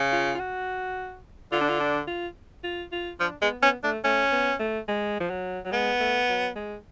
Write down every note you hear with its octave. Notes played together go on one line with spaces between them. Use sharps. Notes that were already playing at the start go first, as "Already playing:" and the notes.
Already playing: C#3
F4
F4
F#4
D3 F4
D4
F4
D4
F4
F4
F4
F3 D4
G#3 B3
B3 C#4
A3 D4
A3 C#4
B3
A3
G#3
F3
F#3
F#3
G#3 B3
A3
F#3
G#3